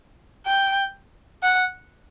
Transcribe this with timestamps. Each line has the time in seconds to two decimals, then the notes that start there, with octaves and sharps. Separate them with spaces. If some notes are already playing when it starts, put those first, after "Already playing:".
0.46 G5
1.43 F#5